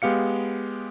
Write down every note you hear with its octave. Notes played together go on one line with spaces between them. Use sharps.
G#3 B3 G4 F5 C#7